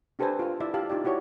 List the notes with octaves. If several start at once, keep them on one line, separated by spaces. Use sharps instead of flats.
D4 G4 A4 B4 C5 G#5
F4 F5
E4 D5 E5
G4 F5 A5
D#4 F4 G4 D5
E4 F#4 G4 C#5 D5